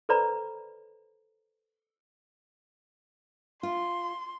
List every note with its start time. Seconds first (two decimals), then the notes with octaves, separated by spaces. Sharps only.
0.09 A4 B4 C5 D5 A#5 B5
3.63 F4 C6